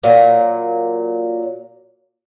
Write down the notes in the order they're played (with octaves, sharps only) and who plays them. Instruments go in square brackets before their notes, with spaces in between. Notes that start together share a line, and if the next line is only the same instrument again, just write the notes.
[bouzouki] A#2 F#3